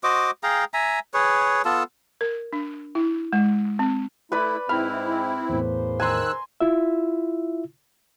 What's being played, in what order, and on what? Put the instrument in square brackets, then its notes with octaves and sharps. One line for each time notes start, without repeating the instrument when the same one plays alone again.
[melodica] F#4 C5 D#5 D6
G#4 F5 G5 A#5
E5 G#5 A#5
G#4 B4 C#5
B3 F4 A4 A5
[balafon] A#4
D4
E4
G#3
C4
[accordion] A3 E4 [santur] B4 D5 B5
[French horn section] G#2 [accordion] C4 E4 [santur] B5 [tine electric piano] F6
[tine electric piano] E2 A2 [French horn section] C#3 A#4 C5
[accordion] D#3 E6 F#6 [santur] G#5 A#5 C6
[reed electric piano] E4 F4 E5